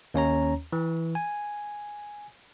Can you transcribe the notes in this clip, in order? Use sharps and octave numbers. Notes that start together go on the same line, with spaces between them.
D#2 C#4 C#5 A#5
E3
G#5